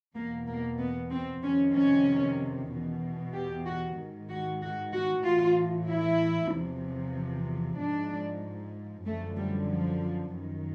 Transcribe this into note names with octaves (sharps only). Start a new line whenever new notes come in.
E2 B2 A#3
A#3
B3
C4
F2 C3 D#3 C#4
C#4
E2 B2
G4
F#4
G#2 D#3
F#4
F#4
F#4
A2 E3 F4
E4
E2 C3 F3
G#2 F3 D4
F#2 D3 F3 A3
G3
F3
F#2 D#3